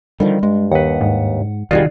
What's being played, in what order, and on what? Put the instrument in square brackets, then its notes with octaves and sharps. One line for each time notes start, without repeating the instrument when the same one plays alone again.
[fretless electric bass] D3 D#3 F3 [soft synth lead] G3
[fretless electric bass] G2 [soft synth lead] G#3
[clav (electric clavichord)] D#2 B4 [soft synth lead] F#5
[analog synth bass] G#2
[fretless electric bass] E1 C2 G3 [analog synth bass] D#3 [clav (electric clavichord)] F4 F#4 G#4 [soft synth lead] D5